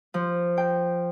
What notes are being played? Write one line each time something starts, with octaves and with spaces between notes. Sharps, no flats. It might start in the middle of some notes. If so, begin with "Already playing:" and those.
F3
G5